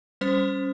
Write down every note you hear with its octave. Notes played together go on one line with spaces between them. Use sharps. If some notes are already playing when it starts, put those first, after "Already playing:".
G3 C#4 C5